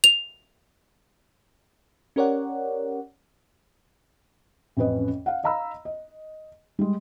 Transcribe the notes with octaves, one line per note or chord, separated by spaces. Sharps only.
F7
C#4 G4 A#4 C#5 D5 F#5
A1 F2 C#4 B4 D#5
F5 F#5
D#5 F5 A#5 B5 E6
D#5
G3 G#3